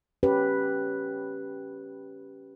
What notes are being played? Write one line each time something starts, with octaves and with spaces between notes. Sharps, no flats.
C#4 G4 B4